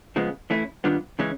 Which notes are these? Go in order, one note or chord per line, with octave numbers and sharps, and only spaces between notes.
C#3 F3 G#3 B3
E3 A3 C#4 E4
D#3 G3 B3 D4 F4
C#3 E3 G#3 C#4